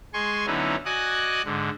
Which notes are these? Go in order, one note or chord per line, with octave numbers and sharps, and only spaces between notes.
G#3 G#5 C6 C#6
D3 F#3 B3 C#4 D#4 E4
F#4 D5 D#5 G#5 F#6
G#2 D3